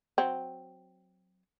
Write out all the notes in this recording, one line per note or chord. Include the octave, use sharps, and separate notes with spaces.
F#3 C4